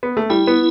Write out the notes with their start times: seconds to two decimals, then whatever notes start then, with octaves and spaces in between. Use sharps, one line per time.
0.03 B3
0.17 A3
0.30 G3 E4
0.47 B3